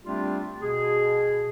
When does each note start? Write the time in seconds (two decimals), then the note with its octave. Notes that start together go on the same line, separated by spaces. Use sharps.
0.05 G3 A3 C4 D4 F4 G4
0.61 B2 G#4